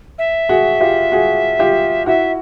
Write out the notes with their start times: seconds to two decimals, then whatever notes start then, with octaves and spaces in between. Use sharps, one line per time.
0.18 E5
0.49 F#4 G#4
0.81 F4 G4
1.12 F#4 G#4
1.59 F4 G4
2.06 E4 F#4 E5